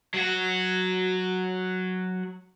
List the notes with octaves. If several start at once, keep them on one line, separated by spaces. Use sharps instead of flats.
F#3 F#4